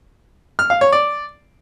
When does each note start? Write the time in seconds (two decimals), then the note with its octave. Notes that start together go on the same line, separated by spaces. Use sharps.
0.59 F6
0.70 F5
0.81 C#5
0.92 D5